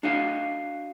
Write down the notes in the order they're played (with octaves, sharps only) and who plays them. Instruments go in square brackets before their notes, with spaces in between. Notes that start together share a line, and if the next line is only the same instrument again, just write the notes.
[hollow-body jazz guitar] D4 F#4 D5 D#5 F5